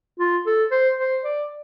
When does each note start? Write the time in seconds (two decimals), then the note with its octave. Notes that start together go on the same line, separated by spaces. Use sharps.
0.19 F4
0.46 A4
0.71 C5
0.98 C5
1.24 D5